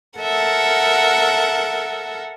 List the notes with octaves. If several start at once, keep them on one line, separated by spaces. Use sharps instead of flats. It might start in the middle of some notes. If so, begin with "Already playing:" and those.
A4 A#4 E5 F#5